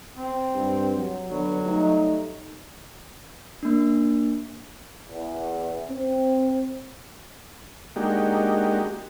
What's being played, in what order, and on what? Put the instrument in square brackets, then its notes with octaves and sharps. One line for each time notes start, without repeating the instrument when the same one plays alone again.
[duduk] C4
[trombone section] G2
F#3
[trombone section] D3 B3 [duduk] F#3
[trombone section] G3 A3 D#4
[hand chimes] A#3 D4
[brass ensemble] E2
C4
[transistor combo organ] G#3 A#3 D4 D#4 F#4 G4